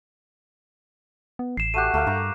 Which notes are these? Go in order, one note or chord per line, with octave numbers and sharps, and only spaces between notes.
B3
A1 C7 E7
A3 F#4 G4 F#6 D#7
D2 A3 A#4 F5
G2 A#5 C#6